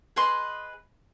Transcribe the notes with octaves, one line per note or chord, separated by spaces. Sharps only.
G#4 B4 D#5 C6